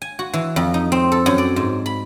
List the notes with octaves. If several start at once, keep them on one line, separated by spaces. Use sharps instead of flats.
G#5
F#4
E3
F2
D#4
C4
A4
F#2
D5
G#2
B5